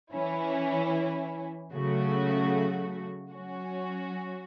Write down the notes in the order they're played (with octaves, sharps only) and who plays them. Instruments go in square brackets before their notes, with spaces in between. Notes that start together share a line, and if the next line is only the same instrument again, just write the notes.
[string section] E3 C#4 E4
C#3 F#3 A3 F#4
F#3 C#4 F#4